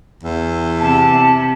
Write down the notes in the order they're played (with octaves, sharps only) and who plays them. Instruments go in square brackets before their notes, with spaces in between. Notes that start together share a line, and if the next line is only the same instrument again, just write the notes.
[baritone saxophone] E2
[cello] C3 [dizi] A5